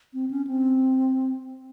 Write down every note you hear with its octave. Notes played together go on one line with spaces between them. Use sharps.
C4
C#4
C4